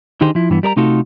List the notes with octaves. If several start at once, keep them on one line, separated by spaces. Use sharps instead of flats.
D3 D#3 D#4 G4 G#4 C5
F3 E4
G2 E3 B3
G3 A#4 D5 A#5
C3 A3 D#4 F4 F#4 A4